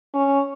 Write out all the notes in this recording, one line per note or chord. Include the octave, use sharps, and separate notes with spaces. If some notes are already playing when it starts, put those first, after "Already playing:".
C#4